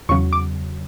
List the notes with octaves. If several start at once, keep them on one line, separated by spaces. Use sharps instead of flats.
E2 C#3 F#3 C#6
D6